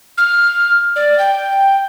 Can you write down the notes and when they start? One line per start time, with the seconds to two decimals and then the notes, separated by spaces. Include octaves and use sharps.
0.18 F6
0.96 D5
1.18 G5